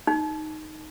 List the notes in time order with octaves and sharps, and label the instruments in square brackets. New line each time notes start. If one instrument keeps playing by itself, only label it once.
[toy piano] D#4